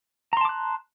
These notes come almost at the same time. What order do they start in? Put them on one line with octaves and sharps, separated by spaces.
A#5 C6 A5 D6 F#6